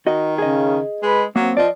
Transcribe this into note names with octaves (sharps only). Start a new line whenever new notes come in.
D#3 F#4 D#5
C#3 G#4 D#5
G#3 B4
F#3 A#3 C4
F3 D5 D#5